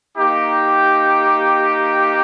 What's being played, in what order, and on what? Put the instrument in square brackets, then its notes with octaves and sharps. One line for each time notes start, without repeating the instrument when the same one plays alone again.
[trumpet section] A#3 D#4 G4